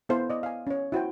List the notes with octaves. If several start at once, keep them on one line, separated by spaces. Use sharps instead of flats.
B3 E4 A4 C5 F5
D5 D#5
F5 G#5
C#4 C#5
E4 F#4 C5 G5